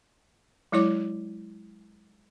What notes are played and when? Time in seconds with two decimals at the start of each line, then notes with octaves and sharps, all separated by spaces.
0.72 F#3 G#3 E4 C#5 D6